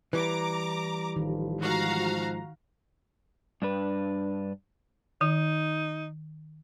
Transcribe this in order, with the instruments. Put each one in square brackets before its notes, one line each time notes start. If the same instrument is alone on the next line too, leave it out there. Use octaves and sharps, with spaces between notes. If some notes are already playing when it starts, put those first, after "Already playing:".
[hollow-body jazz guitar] E3 G3 [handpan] B4 [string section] A#5 D6
[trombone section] A1 F3 [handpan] D#3
[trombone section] G#2 F3 [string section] F#4 F5 A#5
[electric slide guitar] G2 D4 B4
[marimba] D#3 [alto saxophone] D#4